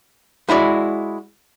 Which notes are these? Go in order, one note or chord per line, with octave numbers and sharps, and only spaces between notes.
G#3 E4 F#4 D5